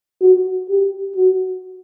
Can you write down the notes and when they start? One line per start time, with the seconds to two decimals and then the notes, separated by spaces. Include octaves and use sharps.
0.21 F#4
0.69 G4
1.16 F#4